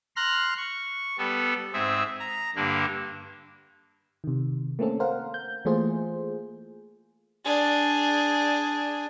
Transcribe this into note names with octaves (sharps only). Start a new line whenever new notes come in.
A#5 C6 F6 F#6
C#6
G3 B3 A4
G#2 C4 G#4 E5
A#5
G2 D3 A#3 D4
C3 D#3
A3 A#3 C4 C#4 A4
A#4 C5 F5 F#5
G6
E3 A3 A#3 F4 G#4 C5
D4 G#4